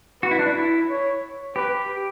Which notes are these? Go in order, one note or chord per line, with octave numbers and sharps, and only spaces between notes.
F#4 B4
E4
D4
E4
C#5
G4 B4